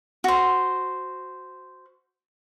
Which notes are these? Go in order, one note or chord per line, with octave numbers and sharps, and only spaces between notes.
F#4 C5